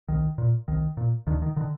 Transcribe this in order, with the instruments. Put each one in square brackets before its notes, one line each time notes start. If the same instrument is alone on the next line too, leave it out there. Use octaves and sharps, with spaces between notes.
[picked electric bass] C2 D#3
A#2
C2 D#3
A#2
D2 D#3
D#3
D3 D#3